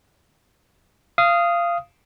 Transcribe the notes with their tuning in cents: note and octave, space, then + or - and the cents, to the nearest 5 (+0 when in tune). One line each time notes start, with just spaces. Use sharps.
F5 -20 D#6 +0